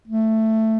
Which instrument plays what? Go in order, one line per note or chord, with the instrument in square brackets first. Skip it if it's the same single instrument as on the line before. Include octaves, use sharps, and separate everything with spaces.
[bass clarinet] A3